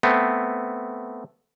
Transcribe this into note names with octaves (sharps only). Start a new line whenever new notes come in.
A3 B3 C4